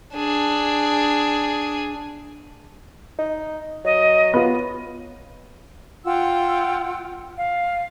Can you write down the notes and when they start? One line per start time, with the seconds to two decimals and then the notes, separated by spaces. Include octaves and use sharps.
0.15 D4 G#4
3.19 D#4
3.85 F#3 D#5
4.34 B3 F4
6.05 F4 F#5 G5 E6
7.36 F5